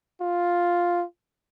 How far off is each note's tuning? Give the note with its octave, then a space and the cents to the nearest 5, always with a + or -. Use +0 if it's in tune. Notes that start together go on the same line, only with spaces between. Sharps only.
F4 +5